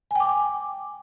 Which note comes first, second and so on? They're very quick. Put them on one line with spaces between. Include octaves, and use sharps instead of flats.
G#5 G5 D6